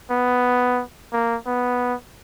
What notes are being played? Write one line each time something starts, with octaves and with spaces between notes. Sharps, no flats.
B3
A#3
B3